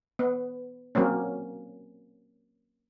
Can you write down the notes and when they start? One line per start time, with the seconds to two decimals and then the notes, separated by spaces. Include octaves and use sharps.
0.19 B3
0.95 F#3 A#3 C4 C#4